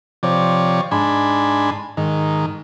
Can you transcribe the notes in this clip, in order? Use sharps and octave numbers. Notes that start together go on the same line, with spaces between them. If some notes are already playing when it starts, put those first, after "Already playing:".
C3 F3 C#5 D5
G#2 D4 G#5 B5 C6
G#2 D#3